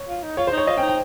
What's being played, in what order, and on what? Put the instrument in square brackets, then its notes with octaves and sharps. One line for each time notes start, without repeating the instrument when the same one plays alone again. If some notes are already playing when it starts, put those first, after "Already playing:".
Already playing: [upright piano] C#5
[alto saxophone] F4
D#4
[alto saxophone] F4 [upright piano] C#5
[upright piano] C5
[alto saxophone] D#4
[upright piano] C#5
[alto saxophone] F4 [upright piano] D#5
[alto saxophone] C#4 [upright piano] G5
[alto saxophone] D#4
[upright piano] G5